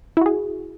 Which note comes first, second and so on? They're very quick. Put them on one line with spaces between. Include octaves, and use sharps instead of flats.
E4 F#4 G#4